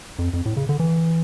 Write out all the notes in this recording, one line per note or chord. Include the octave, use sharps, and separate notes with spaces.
F2
F2
A2
C#3
D3
E3